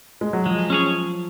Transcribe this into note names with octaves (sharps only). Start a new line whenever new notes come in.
G#3
F#3
F3 G#3
C#4 G#4 C#5